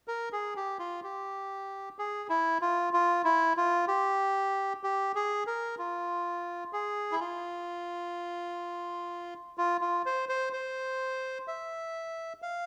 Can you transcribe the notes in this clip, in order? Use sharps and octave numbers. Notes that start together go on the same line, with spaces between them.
A#4
G#4
G4
F4
G4
G#4
E4
F4
F4
E4
F4
G4
G4
G#4
A#4
F4
G#4
E4
F4
F4
F4
C5
C5
C5
E5
F5